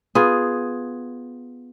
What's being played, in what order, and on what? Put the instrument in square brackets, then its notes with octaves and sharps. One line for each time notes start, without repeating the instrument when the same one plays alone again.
[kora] B3 F4 G#4